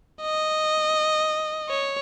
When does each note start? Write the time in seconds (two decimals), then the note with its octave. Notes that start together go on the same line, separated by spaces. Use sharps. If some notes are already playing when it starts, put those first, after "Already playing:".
0.22 D#5
1.69 C#5